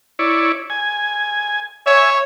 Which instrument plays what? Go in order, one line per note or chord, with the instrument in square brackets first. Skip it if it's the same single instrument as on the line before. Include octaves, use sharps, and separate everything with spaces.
[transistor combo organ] E4 C#5 D5
G#5
[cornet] C#5 [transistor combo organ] E5 G#5